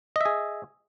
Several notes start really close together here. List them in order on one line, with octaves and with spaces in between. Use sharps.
D#5 E5 G#4